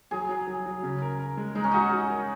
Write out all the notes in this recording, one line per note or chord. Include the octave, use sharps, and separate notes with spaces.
F#3 G#4
F#3
F#3
F#3
C#3
A#4
A#4
G#3
G#3 D#4
C#4
D#4 F#4
F#4
A#4